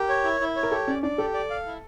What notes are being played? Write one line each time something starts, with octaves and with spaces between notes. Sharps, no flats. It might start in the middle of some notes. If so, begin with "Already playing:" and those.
Already playing: G4 A#4
C#5
E4
E4
C#5
A#4
G4 A4
C#4 D5
D4 D5
G4 A4
D5
F5
E4